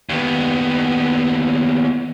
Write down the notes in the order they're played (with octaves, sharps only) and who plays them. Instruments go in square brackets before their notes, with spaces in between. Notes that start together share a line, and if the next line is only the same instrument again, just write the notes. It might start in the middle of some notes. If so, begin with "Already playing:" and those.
[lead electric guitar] D#2 B3